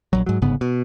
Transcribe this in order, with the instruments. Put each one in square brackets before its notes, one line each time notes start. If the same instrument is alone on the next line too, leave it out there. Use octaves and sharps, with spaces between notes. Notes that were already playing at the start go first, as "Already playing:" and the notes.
[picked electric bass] A#1 F#3
G#2 F#3
G1 G#2 C#3 B3
B2